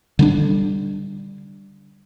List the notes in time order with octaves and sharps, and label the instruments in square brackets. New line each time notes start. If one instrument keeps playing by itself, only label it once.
[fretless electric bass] D3 G3 D4